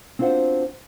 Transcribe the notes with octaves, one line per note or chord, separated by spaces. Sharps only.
C4 D4 F4 F#4 C5 F#5